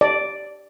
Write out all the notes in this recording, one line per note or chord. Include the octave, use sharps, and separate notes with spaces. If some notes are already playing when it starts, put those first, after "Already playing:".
D5